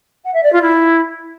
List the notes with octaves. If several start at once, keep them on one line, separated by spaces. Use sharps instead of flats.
F#5
E5
D5
F4
E4